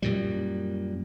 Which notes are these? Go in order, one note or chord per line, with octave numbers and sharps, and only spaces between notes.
F#2 A#2 G3